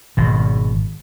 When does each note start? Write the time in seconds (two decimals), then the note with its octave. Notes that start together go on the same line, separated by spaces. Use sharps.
0.17 G#1 B2